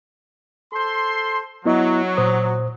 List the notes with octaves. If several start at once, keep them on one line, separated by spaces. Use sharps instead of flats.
A4 C5 C6
F#3 B3 E4 D#5
A#2 C5 D#6